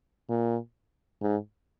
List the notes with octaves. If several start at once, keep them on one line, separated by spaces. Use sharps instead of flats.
A#2
G#2